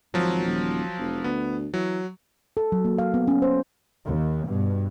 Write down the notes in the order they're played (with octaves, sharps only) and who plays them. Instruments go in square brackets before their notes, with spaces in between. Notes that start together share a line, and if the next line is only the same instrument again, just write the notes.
[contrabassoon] G#1 [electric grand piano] F3 F#3
[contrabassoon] D#1
F1
[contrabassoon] D2 [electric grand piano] B3
[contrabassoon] E3 [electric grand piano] F#3
[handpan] A4
F#3
A#3
F5
B3
C#4
C5
[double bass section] D#2
G2 B2